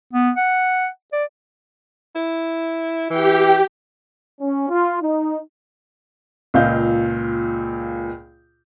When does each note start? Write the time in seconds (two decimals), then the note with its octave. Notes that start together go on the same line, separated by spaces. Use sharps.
0.13 B3
0.37 F#5
1.13 D5
2.16 E4
3.10 E3 G4 G5
4.40 C#4
4.70 F4
5.01 D#4
6.54 C#2 A#2 D#5 F5 G6